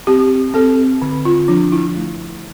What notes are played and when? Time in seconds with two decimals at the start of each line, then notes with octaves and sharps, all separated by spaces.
0.07 C4 G4
0.54 C4 A4
1.02 D3
1.25 F4
1.48 F3 D4
1.72 E4
1.96 A3